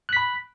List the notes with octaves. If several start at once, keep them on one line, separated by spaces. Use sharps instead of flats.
B5 F#6 B6